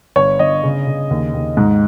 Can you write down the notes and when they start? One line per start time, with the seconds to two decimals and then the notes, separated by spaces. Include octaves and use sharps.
0.16 G1 C#5
0.39 G1 D#5
0.63 C#3
0.87 C#3
1.10 D#2
1.34 D#2
1.57 G#2